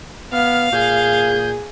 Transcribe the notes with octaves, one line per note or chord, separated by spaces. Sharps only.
B3 F5 F6
A#2 G#4 G6